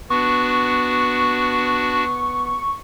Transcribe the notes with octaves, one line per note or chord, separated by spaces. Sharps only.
B3 D4 F#4 C#6